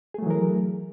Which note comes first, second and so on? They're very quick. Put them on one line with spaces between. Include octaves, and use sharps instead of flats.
G#4 A3 F#3 E3 A#4